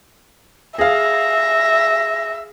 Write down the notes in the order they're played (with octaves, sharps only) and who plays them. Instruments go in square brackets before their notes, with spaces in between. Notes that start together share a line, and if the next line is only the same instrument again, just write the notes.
[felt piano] G#4 F5 [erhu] E5 [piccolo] A#6